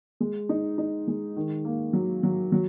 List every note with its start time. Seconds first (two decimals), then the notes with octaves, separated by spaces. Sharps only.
0.20 G#3
0.49 D#4
0.78 D#4
1.08 G#3
1.37 D#3
1.65 A#3
1.93 F#3
2.23 F#3
2.52 F#3